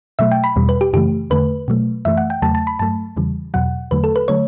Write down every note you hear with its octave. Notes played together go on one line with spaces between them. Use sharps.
B2 F#3 A3 E5
G5
B5
E2 B2 G3
B4
G4
F#2 C#3 E3 A3 G4
E2 D3 A3 B4
B2 F#3 A3
F#2 E3 A3 E5
F#5
G5
E2 C#3 F#3 A3 A5
A5
B5
G2 F#3 A3 A5
E2 C#3 E3 G3
E2 B2 F#3 F#5
E2 D3 F#3 A3 B4
A4
B4
D3 F#3 A3 C#5